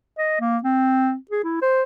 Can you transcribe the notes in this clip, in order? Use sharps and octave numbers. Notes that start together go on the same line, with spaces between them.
D#5
A#3
C4
G#4
E4
C5